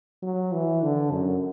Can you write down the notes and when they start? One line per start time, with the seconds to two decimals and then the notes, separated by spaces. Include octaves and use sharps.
0.22 F#3
0.52 E3
0.82 D3
1.11 F#2